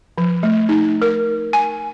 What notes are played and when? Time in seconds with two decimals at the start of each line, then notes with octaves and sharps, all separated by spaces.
0.18 F3
0.43 A3
0.69 D#4
1.02 A#4
1.53 G#5